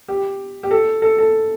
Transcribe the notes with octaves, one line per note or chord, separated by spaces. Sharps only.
G4
G4
A4
A4
A4